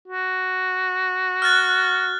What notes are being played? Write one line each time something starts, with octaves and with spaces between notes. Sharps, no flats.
F#4
F6 F#6 A6